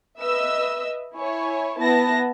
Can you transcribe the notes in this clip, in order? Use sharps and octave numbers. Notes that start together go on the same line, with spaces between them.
B4 D#5 E5 E6
E4 C#5 G#5
B3 E4 A5 A#6